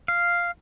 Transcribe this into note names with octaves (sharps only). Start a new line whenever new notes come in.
F5